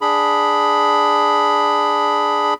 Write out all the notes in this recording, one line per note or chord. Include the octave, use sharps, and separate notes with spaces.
D4 G#4 B5